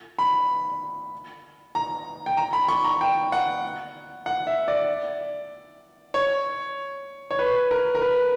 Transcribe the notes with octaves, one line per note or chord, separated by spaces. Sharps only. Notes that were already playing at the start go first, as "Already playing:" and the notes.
B5
A#5
G5
A#5
B5
C#6
A#5
G5
F#5
F#5
E5
D5
C#5
C#5
B4
A#4
A#4
B4